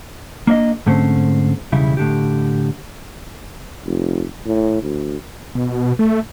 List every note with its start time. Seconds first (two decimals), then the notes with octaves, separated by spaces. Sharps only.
0.47 A#3 D4 D5 D#5
0.86 G#2 D3 A3 C4 C#4 C5
1.72 B1 E2 C#3 G3 E4
1.97 A2 D3 G4
3.86 F1
4.46 A2
4.82 D2
5.55 B2
5.99 A3